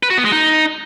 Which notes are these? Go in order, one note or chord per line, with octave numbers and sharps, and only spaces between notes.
B4
F#4
B3
G#3
D#4